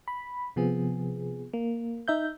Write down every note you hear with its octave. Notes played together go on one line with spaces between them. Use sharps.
B5
C3 F3 B3 G#4
A#3
D#4 E5 G6